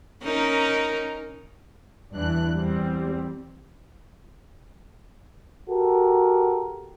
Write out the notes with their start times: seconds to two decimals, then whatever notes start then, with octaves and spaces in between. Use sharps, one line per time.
0.23 C#4 D#4 A#4
2.14 E2 G2 E3 D4 F#6
2.56 E2 G3 C4
5.70 F#4 G4 A4 A#4